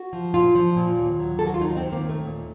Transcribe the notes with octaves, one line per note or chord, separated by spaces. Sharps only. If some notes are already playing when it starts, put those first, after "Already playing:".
Already playing: F#4
F3
A#2 F4
F3
A#2
D#2
F#3
D#2 A4
F#4
F4
F#3 D#4
C4
D#3
A#3
D#2
A3
A#2